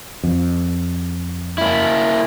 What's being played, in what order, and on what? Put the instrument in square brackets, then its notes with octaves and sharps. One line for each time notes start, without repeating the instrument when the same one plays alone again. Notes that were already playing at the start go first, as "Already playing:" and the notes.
[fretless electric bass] F2
[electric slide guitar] A#3 E4